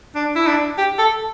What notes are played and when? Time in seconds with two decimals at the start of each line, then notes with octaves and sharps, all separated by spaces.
0.15 D4
0.35 E4
0.47 D4
0.78 G4
0.99 A4